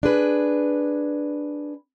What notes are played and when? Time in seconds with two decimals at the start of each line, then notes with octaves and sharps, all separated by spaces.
0.03 D4 G#4 B4